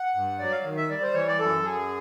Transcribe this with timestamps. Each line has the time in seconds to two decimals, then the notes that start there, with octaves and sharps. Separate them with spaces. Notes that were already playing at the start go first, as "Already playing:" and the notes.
Already playing: F#5
0.15 G2
0.39 F#3 D5
0.52 F5
0.64 D#3
0.77 E5
0.90 G3 D5
1.02 C5
1.14 E3 C#5
1.27 D5
1.39 F#2 A4
1.64 F#2 G#4